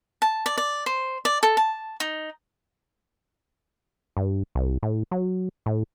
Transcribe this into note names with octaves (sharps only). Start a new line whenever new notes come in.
A5
D5
D5
C5
D5
A4
A5
D#4
G2
C2
A2
F#3
A2